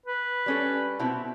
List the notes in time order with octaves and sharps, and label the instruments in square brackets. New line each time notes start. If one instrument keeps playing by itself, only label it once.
[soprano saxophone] B4
[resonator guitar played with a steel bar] G3 C#4 A4
B2 C4 E4